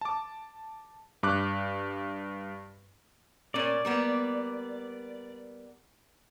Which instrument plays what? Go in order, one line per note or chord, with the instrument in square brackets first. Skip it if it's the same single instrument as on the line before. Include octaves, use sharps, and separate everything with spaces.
[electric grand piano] A5 D6
G2 D6 F#6
[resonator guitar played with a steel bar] A#2 C#4 A#4 [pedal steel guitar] D5
[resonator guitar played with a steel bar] G3 A#3 B3